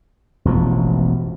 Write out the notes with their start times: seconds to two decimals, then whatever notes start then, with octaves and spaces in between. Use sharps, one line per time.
0.45 E1 A1 B2 F3